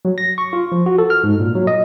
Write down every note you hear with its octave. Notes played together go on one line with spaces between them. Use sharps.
F#3
A#6
C#6
F4
F3
F#4
A4
F6
G#2
A#2
F#3
D#5